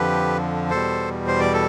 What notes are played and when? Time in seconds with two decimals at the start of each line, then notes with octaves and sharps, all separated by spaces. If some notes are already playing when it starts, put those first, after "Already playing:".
Already playing: F2 D3 F3 G4 B4
0.70 E2 B2 G3 A4 C5
1.27 C5
1.40 D5
1.53 A4